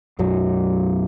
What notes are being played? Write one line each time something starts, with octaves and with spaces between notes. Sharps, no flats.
B1 F#2 F#3